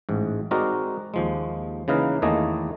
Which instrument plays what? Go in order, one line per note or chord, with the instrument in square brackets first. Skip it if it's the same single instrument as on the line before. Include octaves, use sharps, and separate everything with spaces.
[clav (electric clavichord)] A1 G#2
G#3 C4 D#4 F#4 A#4 D5
D#2 F3 G#3
C#3 E3 A#3 D#4 A#4 B4
E2 D#3 A3 A#3 D#5 G#5